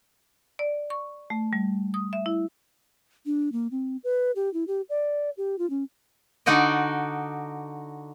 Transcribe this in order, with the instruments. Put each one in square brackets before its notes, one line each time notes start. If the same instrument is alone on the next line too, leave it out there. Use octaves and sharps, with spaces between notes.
[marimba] D5
C#6
A3
G3
D#6
E5
E4
[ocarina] D4
A#3
C4
B4
G4
E4
G4
D5
G4
F4
C#4
[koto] D3 D#4 F#4 D5 D#5